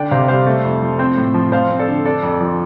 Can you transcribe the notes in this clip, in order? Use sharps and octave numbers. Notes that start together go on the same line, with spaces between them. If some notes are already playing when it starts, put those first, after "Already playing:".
Already playing: D3 D4 D5 G5
C3 C5 F5
G3 C5 F5
A3
F2
F3
C4 C5
A2
F3
F3 C5 F5
C4
A4 D5
D3
D4 A4 D5
F2
F3